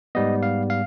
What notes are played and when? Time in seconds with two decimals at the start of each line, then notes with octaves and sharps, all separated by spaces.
0.15 G#2 G3 B3 D#5
0.43 F5
0.70 F5